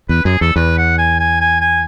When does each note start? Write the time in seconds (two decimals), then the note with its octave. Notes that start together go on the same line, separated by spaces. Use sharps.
0.09 E2 B4
0.25 F#2 G#4
0.41 E2 A4
0.56 E2 B4
0.78 F#5
0.98 G#5
1.19 G#5
1.40 G#5
1.61 G#5